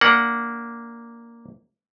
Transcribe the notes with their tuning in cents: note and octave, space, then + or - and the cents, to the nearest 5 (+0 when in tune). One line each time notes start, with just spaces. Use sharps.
A#3 +0 D4 -10 F#5 +0